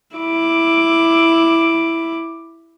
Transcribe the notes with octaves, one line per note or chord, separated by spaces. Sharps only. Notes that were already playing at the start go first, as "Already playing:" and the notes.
E4 D6